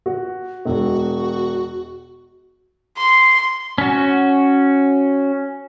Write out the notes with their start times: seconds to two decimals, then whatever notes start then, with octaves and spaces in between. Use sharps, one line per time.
0.06 F#4
0.65 E1 F#4
2.97 C6
3.78 C#4 F#4